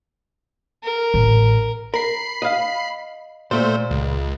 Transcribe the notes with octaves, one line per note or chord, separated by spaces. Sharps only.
A#4
A1
A#4 B5 C7
D#5 F5
A#2 A3 C5
C#2